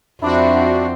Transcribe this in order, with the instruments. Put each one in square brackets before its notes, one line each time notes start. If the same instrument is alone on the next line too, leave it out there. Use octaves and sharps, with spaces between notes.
[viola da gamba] F2 C4 [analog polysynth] D4 F#4 [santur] E4 D5